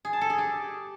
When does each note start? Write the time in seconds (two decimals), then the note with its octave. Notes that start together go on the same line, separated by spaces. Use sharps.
0.05 G#4
0.13 A5
0.21 A4
0.30 G#4
0.38 G4